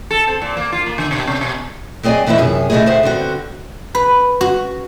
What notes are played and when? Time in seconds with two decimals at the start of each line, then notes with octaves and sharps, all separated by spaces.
0.11 A4
0.27 C4
0.42 A#2
0.57 A#3
0.72 F4
0.86 A#3
0.98 D3
1.11 B2
1.27 C3
1.41 B2
2.03 F#3 C4 G#4 D5 D#5 G#5
2.26 D#2 E3 F3 D#4 E4
2.38 F#2 C3 G#4
2.70 D3 E3 A3 D#4 E4 G#4
2.86 D2 A2 G#4 C5 E5 F#5
3.03 D3 B3 C4 F#4
3.95 B4
4.41 F#4